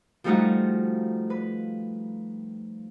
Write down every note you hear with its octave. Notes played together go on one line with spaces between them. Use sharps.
F3 G3 A3 D#4 F4 F#4
B4